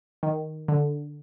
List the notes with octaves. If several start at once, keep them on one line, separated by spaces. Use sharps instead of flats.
D#3
D3